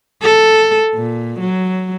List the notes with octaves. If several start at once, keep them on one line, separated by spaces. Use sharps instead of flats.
A4
A#2
F#3